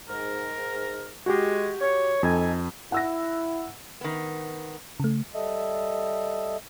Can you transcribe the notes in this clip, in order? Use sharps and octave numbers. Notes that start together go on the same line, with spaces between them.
G#2 A#4
G#3 F#4 G4
C#5
F2 D#4 A4 G#5
E4 F#5 E6 A#6
D#3 B3
C#3 A3
G3 A4 D#5 E5